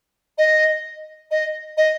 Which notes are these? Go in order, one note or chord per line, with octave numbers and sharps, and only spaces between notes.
D#5
D#5
D#5